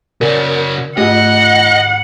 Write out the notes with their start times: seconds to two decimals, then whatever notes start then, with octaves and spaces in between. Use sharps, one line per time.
0.21 C#3 F#4 A#4 D5
0.98 G#2 A3 F4 G#4 D#5 F#5